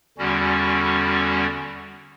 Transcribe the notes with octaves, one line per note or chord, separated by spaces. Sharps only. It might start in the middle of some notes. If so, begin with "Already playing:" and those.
E2 D3 G3 C#4 F#4